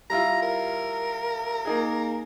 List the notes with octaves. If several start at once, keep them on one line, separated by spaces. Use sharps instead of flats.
G3 E4 F4 A#5
A#4
A#3 D#4 G#4